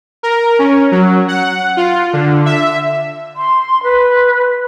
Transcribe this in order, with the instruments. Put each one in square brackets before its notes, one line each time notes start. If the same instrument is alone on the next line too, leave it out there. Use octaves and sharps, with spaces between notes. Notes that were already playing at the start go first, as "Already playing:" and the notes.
[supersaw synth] A#4
C#4
F#3
F#5
F4
D3
E5
[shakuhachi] C6
B4